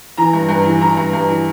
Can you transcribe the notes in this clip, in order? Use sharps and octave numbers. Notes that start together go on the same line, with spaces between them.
E3 A#5
G2
G2
E3
E3 A#5
G2
G2
E3